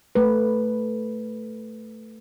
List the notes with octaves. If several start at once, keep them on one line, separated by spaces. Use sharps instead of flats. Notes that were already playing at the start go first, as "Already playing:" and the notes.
A3 B4